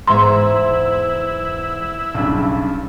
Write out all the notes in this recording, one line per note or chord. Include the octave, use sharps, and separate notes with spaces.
E2 G#2 E4 E5 A#5 C6
B1 G2 C#3